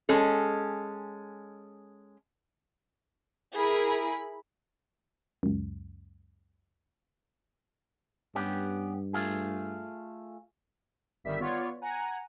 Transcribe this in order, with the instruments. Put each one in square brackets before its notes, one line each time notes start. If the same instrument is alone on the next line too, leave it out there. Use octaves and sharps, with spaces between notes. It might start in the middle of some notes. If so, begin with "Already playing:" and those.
[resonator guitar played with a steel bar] G#3 C#4 A4
[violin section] E4 G#4 A#4 B5
[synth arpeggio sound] C#2 F#2
[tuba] G2 [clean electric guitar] B3 C#4 G4
[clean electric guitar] A3 F4 G#4
[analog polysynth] G1 D#3 G3 G4 E5 B6
B3 F4 C#5 D5
F#5 G#5 A#5